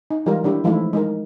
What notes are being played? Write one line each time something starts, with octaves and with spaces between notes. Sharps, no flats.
D#4
E3 G3 G#3 F4 G4 A#4
D#3 G3 D4 E4 G4
E3 F3 G#3 A3 D#4 E4
G#3 D#4 A#4